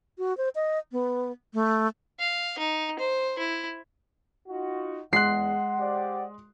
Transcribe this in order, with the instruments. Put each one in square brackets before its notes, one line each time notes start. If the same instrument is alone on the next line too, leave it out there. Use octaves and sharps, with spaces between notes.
[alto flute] F#4
C5
D#5
B3
A3
[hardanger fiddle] F5
D#4
C5
E4
[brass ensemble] D#4 F4 F#4
[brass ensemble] E2 [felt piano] G#3 C6 F#6 [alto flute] F#5 [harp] C7
[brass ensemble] G4 C5 D5